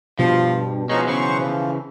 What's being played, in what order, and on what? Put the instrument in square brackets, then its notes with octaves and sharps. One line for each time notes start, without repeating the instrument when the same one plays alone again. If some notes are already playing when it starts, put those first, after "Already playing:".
[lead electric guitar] G2 [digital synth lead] B2 [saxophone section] F3
[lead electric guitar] F3 G#3 [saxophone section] B3 [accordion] C#4 D#4 C#6
[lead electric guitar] C#3 E3 [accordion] F#3 C5 C#6
[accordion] F3